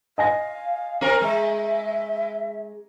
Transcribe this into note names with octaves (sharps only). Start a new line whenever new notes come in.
D#5 F5 G#5 A#6
C4 A#4
G#3 E5